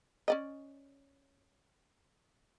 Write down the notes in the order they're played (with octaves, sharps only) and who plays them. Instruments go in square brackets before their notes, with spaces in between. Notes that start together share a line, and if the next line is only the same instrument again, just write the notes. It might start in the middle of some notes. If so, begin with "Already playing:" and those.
[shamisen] C#4 D5 D#5